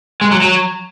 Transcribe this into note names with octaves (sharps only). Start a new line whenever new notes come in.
G#3
F#3
F#3